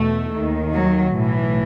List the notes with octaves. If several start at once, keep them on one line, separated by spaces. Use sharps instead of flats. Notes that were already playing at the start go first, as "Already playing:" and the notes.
Already playing: E2 B2 A3
D#2 D#3
F#3
B1 A2 E3